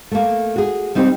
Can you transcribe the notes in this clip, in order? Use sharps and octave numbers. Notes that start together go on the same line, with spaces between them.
A3 A#3
F#4 G#4
G3 C4 D#4 G4 C5